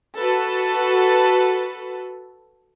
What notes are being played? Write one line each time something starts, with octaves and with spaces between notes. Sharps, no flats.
F#4 A4 B4